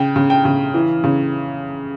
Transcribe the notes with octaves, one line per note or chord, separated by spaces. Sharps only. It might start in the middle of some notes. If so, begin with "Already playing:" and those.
Already playing: C#3 G5
C#3
G5
C#3
E3
C#3